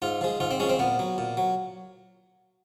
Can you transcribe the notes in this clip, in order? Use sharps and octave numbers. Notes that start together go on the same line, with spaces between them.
G#2 F4
F3 G#3
G#2 F4
C4
F3 G#3 C#4
C4
A#2 B3
F#3
A#2
F#3